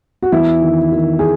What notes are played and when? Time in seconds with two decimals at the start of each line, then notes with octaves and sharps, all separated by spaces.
0.23 F#4
0.32 E2 E4
0.62 D#3
0.92 D#3
1.19 G#4